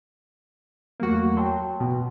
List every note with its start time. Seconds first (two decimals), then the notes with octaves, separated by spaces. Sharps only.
1.00 E2 F#3 A3 A#3 F#4
1.37 F#3 G5 A5 C6
1.80 B2